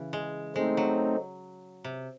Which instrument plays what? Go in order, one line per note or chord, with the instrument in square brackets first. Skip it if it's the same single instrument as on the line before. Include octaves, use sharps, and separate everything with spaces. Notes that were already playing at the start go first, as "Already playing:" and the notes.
Already playing: [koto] C#3 E3
G#3
[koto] G#3 [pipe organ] A3 C4 D#4
[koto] F#3
C3